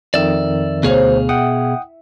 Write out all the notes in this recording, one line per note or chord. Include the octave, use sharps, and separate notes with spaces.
F2 D#3 D5 E5
D2 B2 D#4 G#4 C5 C#5 F5
E4 F#5 G5 D#6